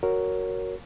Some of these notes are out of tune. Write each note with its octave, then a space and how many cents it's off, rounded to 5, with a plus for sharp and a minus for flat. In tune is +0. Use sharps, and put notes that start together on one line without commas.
F#4 +0 A#4 +0 C#5 +5